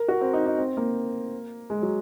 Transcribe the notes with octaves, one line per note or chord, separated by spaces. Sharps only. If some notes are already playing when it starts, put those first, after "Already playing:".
Already playing: A#4
F#4
C4
D#4
D#4
C4
A#3
G#3
F#3